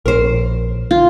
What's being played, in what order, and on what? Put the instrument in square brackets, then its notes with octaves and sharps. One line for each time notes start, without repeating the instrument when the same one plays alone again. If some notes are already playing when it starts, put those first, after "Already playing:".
[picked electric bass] A#1 [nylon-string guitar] A#4 C5
[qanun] F4